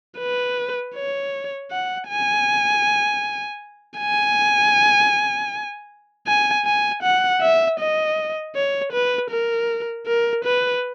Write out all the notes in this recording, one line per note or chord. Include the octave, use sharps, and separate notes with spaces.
B4
C#5
F#5
G#5
G#5
G#5
G#5
F#5
E5
D#5
C#5
B4
A#4
A#4
B4